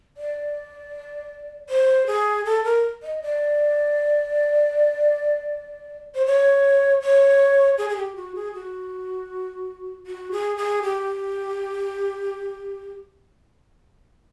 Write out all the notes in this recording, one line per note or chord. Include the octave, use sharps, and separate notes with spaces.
D5
C5
G#4
A4
A#4
D#5
D5
C5
C#5
C#5
G#4
G#4
G4
F#4
G#4
F#4
F#4
G#4
G#4
G4